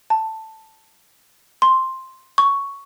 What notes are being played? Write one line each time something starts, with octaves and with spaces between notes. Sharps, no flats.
A5
C6
C#6